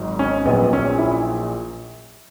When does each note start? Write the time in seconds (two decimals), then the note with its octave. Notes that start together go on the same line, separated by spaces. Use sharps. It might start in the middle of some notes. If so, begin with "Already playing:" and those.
Already playing: G#1 G#2 F#3
0.19 C#4
0.45 A#1 A#2 F#3 B3
0.73 C#4
0.98 E4